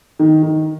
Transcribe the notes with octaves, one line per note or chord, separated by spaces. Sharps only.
D#3
D#3